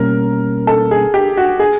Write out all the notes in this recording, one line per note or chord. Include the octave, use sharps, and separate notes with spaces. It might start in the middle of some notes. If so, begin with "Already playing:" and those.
Already playing: B2 G3 A#3 C#4 A#4
A4
G#4
G4
F#4
G#4